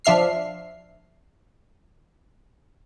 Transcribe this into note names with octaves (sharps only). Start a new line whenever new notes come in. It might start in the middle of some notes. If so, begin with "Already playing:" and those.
F3 D4 E5 F6 C7